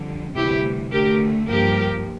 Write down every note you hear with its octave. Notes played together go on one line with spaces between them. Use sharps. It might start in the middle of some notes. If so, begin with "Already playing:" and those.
Already playing: F2 D3 G3
D2 C3 E3 G3 E4 G4
D2 D3 A3 G4 A#4
G2 F3 A#3 G4 A#4